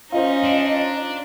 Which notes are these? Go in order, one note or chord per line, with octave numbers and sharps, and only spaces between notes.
C#4 D#4 F4 C5 D#5
D4